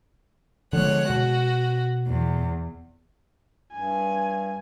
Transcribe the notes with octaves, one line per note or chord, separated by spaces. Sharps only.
D3 F3 G#3 B3 C#5 F#6
B2 F#4
E2
G2 G#5